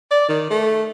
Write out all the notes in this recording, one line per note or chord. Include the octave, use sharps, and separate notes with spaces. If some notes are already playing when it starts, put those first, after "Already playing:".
D5
D#3
A3